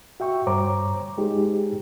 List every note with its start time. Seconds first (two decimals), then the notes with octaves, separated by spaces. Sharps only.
0.20 F#4 E5 G5 C#6
0.47 G2 G3 C5 C#5 A#5 D6
1.18 G#3 D#4 G4 G#4